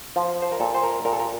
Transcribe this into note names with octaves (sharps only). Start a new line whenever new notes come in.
F3
C5
A#4
A#2 A4
C5
A#4
A#2 A#4
A4
A#4